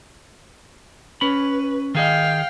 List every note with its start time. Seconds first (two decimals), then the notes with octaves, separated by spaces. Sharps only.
1.21 C#4 B4 B5
1.95 D#3 G#4 D#5 F5 G5